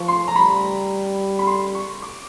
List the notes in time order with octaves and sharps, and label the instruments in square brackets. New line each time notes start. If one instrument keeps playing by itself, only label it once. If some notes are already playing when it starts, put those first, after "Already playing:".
Already playing: [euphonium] F3 [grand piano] C#6
[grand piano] C6
A#5
[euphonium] G3 [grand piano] B5
[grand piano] B5
C6
C#6
D6